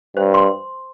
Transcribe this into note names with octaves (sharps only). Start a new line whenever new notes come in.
G2 C5
C6